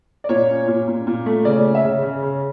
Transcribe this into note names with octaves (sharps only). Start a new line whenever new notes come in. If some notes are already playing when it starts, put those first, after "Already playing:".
D5
A#2 C#5
C#4
A#2
A#2
A#2
A3
C#3 D5
C#4
E5
C#3
C#3
C#3